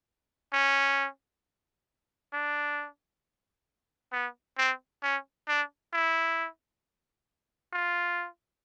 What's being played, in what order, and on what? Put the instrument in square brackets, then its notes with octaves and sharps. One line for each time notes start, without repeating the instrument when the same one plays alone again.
[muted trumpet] C#4
D4
B3
C4
C#4
D4
E4
F4